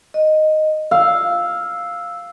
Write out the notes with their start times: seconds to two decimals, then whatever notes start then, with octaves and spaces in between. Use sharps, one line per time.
0.14 D#5
0.91 F5 E6